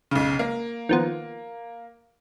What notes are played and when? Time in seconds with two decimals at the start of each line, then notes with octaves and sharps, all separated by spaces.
0.11 B1 C#3
0.39 A#3
0.89 D#3 F3 B3